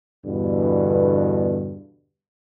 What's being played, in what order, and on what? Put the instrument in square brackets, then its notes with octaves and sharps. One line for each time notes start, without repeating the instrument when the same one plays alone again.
[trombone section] E2 G2 B2 D3